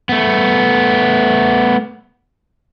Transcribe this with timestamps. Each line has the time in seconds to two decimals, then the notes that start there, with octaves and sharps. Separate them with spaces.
0.09 A3 B3